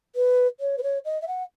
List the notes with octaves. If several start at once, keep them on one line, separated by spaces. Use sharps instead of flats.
B4
C#5
B4
C#5
D#5
E5
F#5